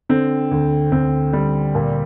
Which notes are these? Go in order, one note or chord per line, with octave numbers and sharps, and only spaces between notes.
D3 C4
D2
D2 C4
G3
A#2